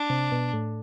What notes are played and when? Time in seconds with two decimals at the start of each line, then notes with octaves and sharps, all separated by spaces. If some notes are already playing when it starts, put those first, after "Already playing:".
Already playing: D4
0.10 C3
0.32 B2
0.53 A2